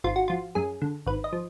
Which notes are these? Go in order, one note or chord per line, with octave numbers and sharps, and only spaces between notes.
G#1 F4
F#4
F3 F4
F#2 G#4
D3
G#1 B4
D#5
F3